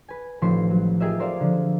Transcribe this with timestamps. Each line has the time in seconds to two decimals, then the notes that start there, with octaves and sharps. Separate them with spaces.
0.08 B4 G#5
0.41 A1 D#3 F3 C4 B4 C6
0.70 F#3
1.00 F4 G4 G#4 A#4 D#5 E5
1.19 A#4 C5 D5 F5
1.40 D3 F3 D4